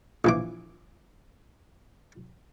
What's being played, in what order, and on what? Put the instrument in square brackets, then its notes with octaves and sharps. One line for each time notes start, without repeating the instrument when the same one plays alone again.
[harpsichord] A#1 E3 D6